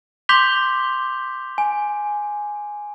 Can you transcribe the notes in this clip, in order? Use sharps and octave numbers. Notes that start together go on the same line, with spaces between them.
C6 D6 G6 B6 F7 G7
G#5